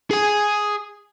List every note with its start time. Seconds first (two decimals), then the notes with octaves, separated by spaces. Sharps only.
0.11 G#4 G#5